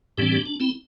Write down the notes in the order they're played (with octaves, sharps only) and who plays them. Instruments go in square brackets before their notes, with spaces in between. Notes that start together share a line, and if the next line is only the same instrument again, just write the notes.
[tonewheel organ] A2 E3 G3 C4 D4 G4
D4 G4
D4
C4 E4